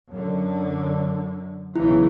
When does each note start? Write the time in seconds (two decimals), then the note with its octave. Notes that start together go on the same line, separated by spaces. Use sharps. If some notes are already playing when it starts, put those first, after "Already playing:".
0.10 F#2 D3
1.76 B1 C#3 E3 E4